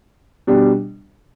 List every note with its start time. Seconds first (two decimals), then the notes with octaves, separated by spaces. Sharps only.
0.47 B2 G3 D4 G4